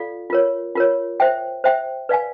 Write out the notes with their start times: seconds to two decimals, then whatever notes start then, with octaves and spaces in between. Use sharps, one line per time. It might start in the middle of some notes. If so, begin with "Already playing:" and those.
Already playing: F4 A4 D5 F5
0.30 F4 A#4 C#5
0.75 F4 A#4 C#5
1.20 C5 E5 G5
1.64 C5 E5 G5
2.09 B4 D5 F5 G#5